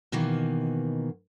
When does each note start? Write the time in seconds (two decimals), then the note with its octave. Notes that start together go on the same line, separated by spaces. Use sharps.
0.12 B2 D#3 E3 A#3